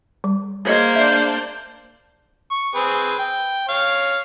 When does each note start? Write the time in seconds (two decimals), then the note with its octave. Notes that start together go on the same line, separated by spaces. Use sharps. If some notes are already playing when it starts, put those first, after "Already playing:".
0.24 G3
0.65 A#3 G#4 C5 C#5 D#5
0.96 D4 D5 E5 G6
2.51 C#6
2.75 C4 G#4 B4
3.19 G5
3.69 C#5 F5